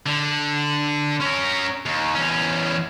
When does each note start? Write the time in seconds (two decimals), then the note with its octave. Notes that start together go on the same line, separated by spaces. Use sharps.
0.06 D3
1.20 C#4 A#4
1.86 D#2
2.15 E2 C#4